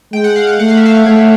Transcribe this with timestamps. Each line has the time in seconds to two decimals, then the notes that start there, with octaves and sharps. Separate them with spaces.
0.13 G#3 G5
0.24 F#5
0.36 F5
0.47 F#5
0.60 A3 F#5
0.68 F5
0.77 E5
0.86 F5
1.06 A3 C#5